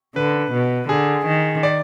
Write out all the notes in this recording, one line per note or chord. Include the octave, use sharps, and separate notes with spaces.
D3 B4
B2
D3 G#4
D#3
D5